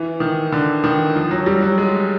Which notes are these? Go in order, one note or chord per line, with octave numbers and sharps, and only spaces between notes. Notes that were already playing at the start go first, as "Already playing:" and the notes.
Already playing: E3
D#3
D3
D#3
F3
F#3
G3
F#3
G#3